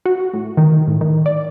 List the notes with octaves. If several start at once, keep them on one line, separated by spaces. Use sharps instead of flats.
F#4
A2
D#3
A2
D#3
D5